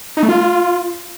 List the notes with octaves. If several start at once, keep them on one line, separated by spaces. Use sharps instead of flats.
D#4
A3
F4